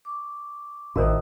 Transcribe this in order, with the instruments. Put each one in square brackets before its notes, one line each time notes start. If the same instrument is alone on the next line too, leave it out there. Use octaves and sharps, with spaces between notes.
[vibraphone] C#6 D6
[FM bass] A1 [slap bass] A2 D#3 [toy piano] F#4 A#4 C5 [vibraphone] D#5 D#6